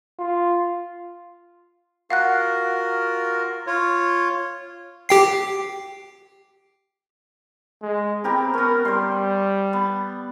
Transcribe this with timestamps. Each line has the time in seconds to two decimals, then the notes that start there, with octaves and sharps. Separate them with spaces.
0.19 F4
2.10 F4 F#4 A#4 F5 F#5 F#6
3.67 F4 C#5
5.09 G4 G5 C7
7.82 G#3
8.24 B3 C4 G4 A#4
8.54 B3 C#4 A#4
8.85 G3 C5 C6
9.73 B3